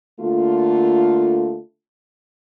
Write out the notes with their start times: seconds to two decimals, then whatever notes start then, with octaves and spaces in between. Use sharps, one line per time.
0.21 D3 A3 A#3 F4